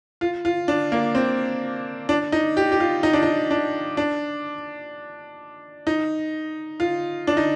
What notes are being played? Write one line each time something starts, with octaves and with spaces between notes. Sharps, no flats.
F4
F4
D4
A#3
C4
D4
D#4
G4
G4
F4
D#4
D4
D#4
D4
D4
D#4
F4
D4
D#4